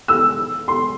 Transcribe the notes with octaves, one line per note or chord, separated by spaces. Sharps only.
E6
C6